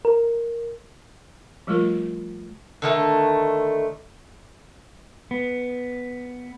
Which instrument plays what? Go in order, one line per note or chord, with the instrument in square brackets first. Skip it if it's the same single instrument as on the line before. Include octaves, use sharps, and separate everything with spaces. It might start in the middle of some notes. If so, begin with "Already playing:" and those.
[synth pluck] A#4
[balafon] F3 G3 A3 F4 A#4
[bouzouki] D3 D#3 A3
[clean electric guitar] B3